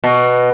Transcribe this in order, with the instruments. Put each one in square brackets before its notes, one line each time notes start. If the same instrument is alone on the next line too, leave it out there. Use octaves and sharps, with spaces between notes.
[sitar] B2